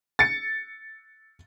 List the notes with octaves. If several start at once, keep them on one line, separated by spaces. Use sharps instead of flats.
A6 C#7